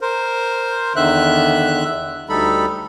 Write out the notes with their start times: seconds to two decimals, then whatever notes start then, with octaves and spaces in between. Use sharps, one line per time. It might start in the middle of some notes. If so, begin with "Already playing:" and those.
0.01 A#4 C5
0.96 E2 D3 D#3 E5 F#6
2.29 D2 G3 D#4 A4 B5